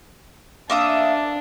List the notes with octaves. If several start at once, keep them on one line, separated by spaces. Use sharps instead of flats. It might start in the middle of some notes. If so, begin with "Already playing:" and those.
A#3 D4 E5 D#6